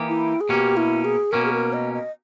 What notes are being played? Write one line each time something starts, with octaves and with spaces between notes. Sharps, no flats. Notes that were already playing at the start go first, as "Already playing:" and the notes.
Already playing: E3 A#3 D#4 G4
E4
G#4
B2 A#3 C#4 G4
E4
G#4
B2 A#3 C#4 A#4
G#4
A#4
D#5
D#5